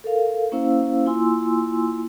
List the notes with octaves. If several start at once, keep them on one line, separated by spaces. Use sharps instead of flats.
A4 A#4 F5
A#3 C#4 E4 C5 F5 E6
A#3 E4 F4 G#5 C6 E6